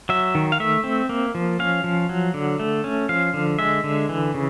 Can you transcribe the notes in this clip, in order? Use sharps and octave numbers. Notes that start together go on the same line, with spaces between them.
F#3 E5
D#3
F5
A3 E5
C4
A#3
F3
C#4 F5
F3
F#3
D3
A3
C#4
F3 F5
D3
G#3 E5
D3
E3
C#3